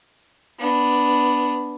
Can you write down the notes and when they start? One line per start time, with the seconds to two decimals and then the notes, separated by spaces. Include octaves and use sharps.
0.59 B3 D4